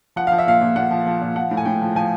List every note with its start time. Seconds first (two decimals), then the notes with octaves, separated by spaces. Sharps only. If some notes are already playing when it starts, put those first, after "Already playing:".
0.16 F3 F#5
0.27 F3 F5
0.38 E5
0.47 A#2 F5
0.61 A#2
0.76 A#2 F#5
0.91 F3
1.06 F3
1.22 A#2
1.36 F3 F#5
1.51 A2
1.57 G#5
1.65 A2 G5
1.82 F3
1.96 F3 G#5